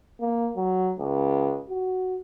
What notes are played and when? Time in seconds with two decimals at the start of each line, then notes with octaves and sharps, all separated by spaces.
0.21 A#3
0.57 F#3
0.99 C#2
1.70 F#4